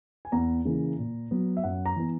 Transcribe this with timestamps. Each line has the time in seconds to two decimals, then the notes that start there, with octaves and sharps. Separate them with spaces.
0.25 G#5
0.32 E2 A#5
0.65 C#3 E3 A#3
0.99 A#2
1.31 F#3 B3
1.57 E5
1.64 F#2 F#5
1.86 A#5
1.96 E3 B3